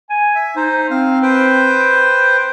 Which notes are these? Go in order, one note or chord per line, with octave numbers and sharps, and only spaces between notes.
G#5
E5
D#4 C5
C4 F5
B4 C5 G5